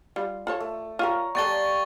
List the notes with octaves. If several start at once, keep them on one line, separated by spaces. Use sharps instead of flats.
G3 F4
F4 A4 C#5
A3
F4 G4 A#4 C#5 A#5
G3 B3 A4 F5 G5 C#6 A6 G7